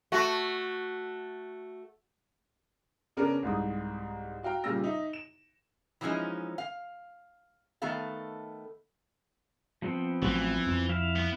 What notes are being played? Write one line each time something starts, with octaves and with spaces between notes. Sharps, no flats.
A3 F#4
C#3 B3 C#4 D4 A#4
C2 G#2 D#6
F#4 F5 G5 A#5
A#2 C#3 G3 F4 E6 A#6
D#4 E5
E7
E3 F3 G#3 C#4 D#4
F5
D#3 A3 B3 A4 F5
F3 B3 C4
A1 E3 F#3
F2
E4 E5 F5
B3